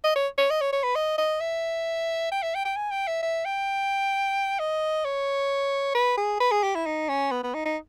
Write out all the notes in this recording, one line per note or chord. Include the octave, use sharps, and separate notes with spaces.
D#5
C#5
C#5
D#5
C#5
C#5
B4
D#5
D#5
E5
G5
E5
G5
G5
G#5
G5
E5
E5
G5
D#5
C#5
B4
G#4
B4
G#4
G4
E4
D#4
C#4
B3
B3
D#4
D#4